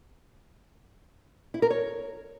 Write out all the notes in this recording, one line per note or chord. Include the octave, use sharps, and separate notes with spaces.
E4
A#4
C#5